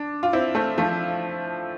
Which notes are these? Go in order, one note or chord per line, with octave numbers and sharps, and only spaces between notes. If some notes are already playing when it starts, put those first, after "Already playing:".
Already playing: D4
F4
C4 E4
A3 C4
F3 A3